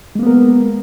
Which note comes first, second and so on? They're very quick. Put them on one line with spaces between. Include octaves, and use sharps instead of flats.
G#3 A#3 B3 A#4